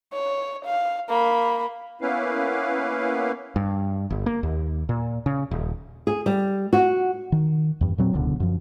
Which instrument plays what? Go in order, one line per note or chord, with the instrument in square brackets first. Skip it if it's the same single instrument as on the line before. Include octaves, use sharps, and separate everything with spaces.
[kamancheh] C#5
F5
A#3 B5
[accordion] A#3 B3 C#4 E4 B4 F5
[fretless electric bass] G2
G1
A#3
D#2
A#2
C#3
D#1
[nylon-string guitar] G#4
G3
F#4
[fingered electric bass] D#3
E2 G2
A#2 F#3 C4
D1 C#2 B2 D3
F#2 F3